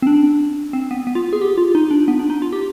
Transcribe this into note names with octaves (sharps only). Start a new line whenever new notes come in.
C4
D4
C4
B3
B3
F4
G#4
G4
F4
D#4
D4
B3
D4
D#4
F4
G4